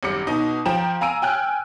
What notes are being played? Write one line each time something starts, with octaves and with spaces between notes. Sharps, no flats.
G#1 F#2 G3 D6 C#7
B2 D#4
F3 G5 A#5 E7
F5 G#5 A#5 E6 D7 D#7
G5 G#5 F6 F#6